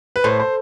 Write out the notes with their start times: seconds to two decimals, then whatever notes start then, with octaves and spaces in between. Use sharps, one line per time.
0.16 B4
0.24 A2 C5
0.40 C5